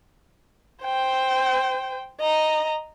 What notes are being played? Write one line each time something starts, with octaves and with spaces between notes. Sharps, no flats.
C5 G5
D#5 A#5